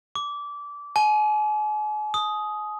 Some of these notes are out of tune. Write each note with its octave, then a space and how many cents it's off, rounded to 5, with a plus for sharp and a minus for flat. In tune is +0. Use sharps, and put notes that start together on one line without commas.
D6 -20
G#5 +40
D#6 +5